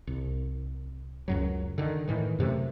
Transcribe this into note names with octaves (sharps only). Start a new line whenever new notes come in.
C2
C#2 F#2 F#3
D3 D#3
A2 D#3 E3
F#2 C3 A3